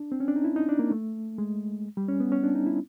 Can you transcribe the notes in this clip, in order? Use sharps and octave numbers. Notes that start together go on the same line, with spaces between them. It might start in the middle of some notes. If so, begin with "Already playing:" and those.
Already playing: D4
C4
C#4
D4
D#4
E4
D#4
D4
A#3
A3
G#3
G3
C#4
B3
C#4
D4
D#4
E4